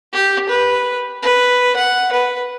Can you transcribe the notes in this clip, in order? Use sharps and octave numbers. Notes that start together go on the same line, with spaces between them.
G4
B4
B4
F#5
B4